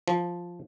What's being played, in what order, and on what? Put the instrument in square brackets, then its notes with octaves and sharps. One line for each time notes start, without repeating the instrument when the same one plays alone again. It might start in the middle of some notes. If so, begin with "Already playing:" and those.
[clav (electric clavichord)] F3